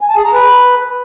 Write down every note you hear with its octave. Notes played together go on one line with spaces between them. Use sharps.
G#5
A5
G#4
A#5
B4